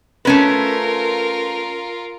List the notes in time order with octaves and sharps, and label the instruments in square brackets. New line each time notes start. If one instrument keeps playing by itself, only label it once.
[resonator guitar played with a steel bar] A3 C#4 B4 [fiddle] F4 A#4